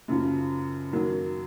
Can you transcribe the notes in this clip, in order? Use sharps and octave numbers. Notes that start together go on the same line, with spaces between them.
F#2 C#3 F3
F#2 D#3 F#3 A#3